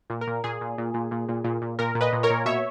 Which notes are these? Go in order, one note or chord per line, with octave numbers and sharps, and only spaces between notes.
A#2
A#4
A#2
A#2 G#4
A#2
A#2
A#2
A#2
A#2
A#2
A#2
A#2 A#4
A#2
B4 D#5
A#2
A#4 C#5
A#2
B2 C#5 E5